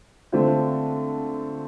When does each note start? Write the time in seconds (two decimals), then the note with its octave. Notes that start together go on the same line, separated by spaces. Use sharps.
0.32 D3 A3 C4 F4